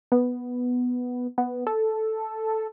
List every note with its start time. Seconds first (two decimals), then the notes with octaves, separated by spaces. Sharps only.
0.12 B3
1.38 B3
1.67 A4